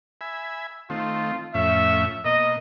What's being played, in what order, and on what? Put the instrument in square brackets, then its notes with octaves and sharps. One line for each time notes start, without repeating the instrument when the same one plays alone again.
[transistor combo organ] E5 G#5 B5
[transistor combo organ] D#3 A3 C4 [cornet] F4
[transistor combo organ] F2 A2 C#4 [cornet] E5
[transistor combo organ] B2 A#3 [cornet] D#5